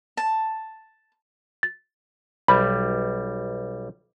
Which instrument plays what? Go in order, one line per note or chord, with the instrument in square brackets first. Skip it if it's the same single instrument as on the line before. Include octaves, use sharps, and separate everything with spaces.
[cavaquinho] A5
[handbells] A6
[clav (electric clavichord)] B1 G3 [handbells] B5